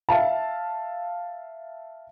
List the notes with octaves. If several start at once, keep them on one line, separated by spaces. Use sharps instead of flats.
E5 F5 A5